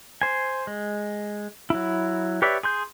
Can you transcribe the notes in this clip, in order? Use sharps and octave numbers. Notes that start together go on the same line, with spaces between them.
C5 G#5
G#3
F#3 E4
G4 B4 C#5 D5 E5
G#4 C6 G6